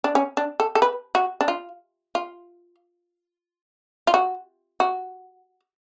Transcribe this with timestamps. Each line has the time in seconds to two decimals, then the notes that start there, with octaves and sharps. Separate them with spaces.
0.04 D4
0.15 C#4
0.37 D4
0.60 A4
0.75 A4
0.82 B4
1.15 F#4
1.41 D4
1.48 F4
2.15 F4
4.07 F4
4.14 F#4
4.80 F#4